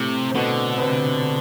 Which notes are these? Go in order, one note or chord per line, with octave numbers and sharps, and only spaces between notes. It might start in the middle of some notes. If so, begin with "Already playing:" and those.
Already playing: A2 C3 A3
C4
B2 D3 B3
B3
C3 C4